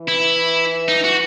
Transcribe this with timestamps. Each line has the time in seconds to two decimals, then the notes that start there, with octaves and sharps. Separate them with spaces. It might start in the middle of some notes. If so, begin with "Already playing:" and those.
Already playing: E3
0.09 E4
0.88 D#4
1.04 F#4